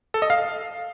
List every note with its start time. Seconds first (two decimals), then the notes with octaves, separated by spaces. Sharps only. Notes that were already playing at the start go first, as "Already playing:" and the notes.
0.14 A4
0.22 D#5
0.30 F5